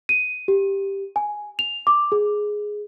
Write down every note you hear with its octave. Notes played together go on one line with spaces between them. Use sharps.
D#7
G4
G#5
F7
D6
G#4